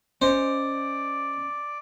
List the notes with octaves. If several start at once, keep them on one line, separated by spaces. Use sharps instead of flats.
C#4 C5 D5 D#5